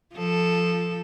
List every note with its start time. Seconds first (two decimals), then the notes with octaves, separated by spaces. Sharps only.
0.14 F3 A4